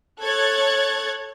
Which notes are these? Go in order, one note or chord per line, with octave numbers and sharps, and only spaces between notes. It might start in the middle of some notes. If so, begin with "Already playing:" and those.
A4 C#5 F#6 G#6 A6